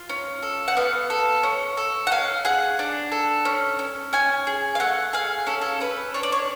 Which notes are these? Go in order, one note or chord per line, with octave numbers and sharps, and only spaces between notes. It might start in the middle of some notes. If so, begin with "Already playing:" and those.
Already playing: F4
C#4
A4
F#5
B3 F5
A4
C#4
A4
F#5
C#4 F5
G#4 F#5
D4
A4
C#4
C#4
C#4 G#5
G#4
F5
A3 F#5
G#4 F5
C#4 A4
A4
C#4 B4
D4 C#5
D5
C#5